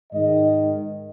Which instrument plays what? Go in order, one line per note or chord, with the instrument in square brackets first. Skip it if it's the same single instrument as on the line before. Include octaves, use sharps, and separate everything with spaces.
[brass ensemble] G#2 D#3 D#5